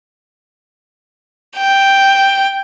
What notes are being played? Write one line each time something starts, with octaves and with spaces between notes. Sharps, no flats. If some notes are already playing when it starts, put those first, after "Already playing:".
G5